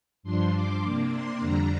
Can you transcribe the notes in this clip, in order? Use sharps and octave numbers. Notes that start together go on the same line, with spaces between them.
G2 F3 D4 C6
D6
C3 A#3 D4 D6
C6
F2 D3 G3 D4 A#5